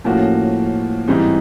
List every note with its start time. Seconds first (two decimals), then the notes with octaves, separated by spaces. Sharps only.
0.04 A2 F3 A#3 C#4 F#4
1.08 G#2 E3 G3 C4 D#4